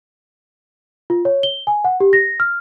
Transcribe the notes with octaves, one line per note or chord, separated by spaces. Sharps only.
F4
C#5
G7
G#5
F#5
G4
A#6
F6